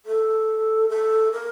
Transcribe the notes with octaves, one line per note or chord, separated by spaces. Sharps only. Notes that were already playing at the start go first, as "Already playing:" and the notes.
A4
A4
A#4